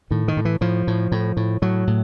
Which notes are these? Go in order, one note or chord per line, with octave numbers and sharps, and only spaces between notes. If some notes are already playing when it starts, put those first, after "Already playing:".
A2 D#3
D#3
A2
E3
A2 F3
A2
A2
A2
A2 F#3
A2